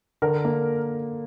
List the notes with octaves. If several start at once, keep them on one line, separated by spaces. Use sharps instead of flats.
D3 A#4
A#3